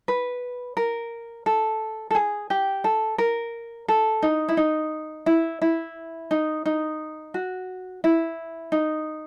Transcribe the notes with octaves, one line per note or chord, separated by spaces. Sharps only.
B4
A#4
A4
A4
G#4
G4
A4
A#4
A4
D#4
E4
D#4
E4
E4
D#4
D#4
F#4
E4
D#4